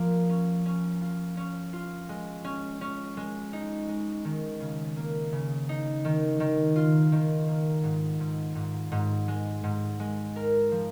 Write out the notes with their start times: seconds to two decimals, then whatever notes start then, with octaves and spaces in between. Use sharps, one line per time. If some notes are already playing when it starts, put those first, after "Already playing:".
Already playing: F3 A#3
0.29 C#4
0.66 C#4
1.01 F4
1.37 C#4
1.73 F4
2.09 G#3
2.44 C#4
2.81 C#4
3.17 G#3
3.53 D#4
3.89 G#3
4.25 D#3
4.61 C#3
4.96 A#3
5.32 C#3
5.69 D#4
6.05 D#3
6.40 D#3
6.76 F4
7.12 D#3
7.48 A#3
7.83 G#2
8.20 G#2
8.55 G#2
8.92 G#2
9.28 G#3
9.64 G#2
10.00 G#3
10.36 A#4
10.72 F3